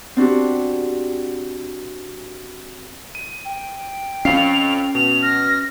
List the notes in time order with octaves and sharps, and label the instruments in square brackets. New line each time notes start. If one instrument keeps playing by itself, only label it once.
[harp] C4 D4 F#4 G4
[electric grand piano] D#7
[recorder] G5
[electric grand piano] F2 F5 C7 [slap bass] C#4 [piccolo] F7
[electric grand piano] B2 [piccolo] F7
[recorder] F6 [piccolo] A#6